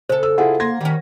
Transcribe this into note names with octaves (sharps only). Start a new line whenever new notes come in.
C#3 A4 C5
E6
E4 F4 G#4 F#5
A#3 C6 G#6 A#6
D#3 G3 C#4